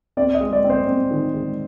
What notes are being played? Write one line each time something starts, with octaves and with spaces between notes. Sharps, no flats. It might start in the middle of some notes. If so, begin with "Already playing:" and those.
C4 D5
D#5
G#3
D5
C4
C5
C4
D#3
G#3